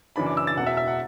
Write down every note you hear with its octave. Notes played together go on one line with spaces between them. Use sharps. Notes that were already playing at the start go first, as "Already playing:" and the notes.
F#1 F#2 E3 D4 B5
D6
E6
A6
E1 E2 B2 F#5
E5
E5
F#5